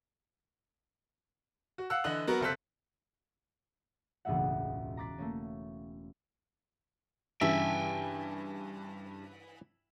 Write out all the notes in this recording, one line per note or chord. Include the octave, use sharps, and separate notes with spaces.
F#4
F5 F#5 E6 F#6
D3 E3 D#5 F#6 F#7
F#3 B3 F#4 A#4
F#1 C3 A4 C5 F#6 B6
E1 C#2 A2 A#3 E5 F#5
A#5 C6 D6 F#6 A6 B6
A3 A#3 C#4
G2 C#3 E3 E5 G5 G#5